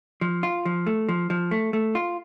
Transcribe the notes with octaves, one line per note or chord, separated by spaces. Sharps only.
F3
F4
F3
A3
F3
F3
A3
A3
F4